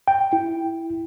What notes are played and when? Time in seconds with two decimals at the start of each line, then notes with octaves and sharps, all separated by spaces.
0.08 G5
0.33 E4